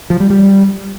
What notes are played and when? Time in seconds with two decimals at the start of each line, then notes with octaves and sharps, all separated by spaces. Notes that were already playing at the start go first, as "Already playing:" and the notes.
0.10 F3
0.20 G3
0.30 G3